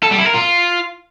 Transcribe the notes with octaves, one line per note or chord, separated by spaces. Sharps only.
A4
G3
E4
A#4
F4